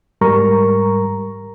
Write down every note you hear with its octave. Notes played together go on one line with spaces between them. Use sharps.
G#2 G3 A#4 A#5 C#6